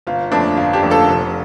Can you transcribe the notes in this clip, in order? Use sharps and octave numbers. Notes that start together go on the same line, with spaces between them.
G1 F4
F2 F3 A3 D4
G1 F4
D4 G4
F2 F3 A3
F4 A4
F1